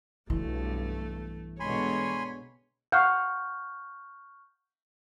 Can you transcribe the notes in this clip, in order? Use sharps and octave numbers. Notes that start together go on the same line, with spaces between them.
B1 G2 E3 A3
B2 D3 G#3 C#5 G#5 B5 C6
F5 F#5 C#6 F6 G6